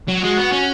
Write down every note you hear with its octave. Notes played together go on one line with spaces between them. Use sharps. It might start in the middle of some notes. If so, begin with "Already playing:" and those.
F#3
G#3 F#4
B3
C#4